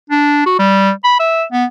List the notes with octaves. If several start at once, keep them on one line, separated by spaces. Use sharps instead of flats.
D4
F#4
G3
B5
E5
B3